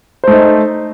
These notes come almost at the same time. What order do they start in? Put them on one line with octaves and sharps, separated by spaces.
C5 A3 D#4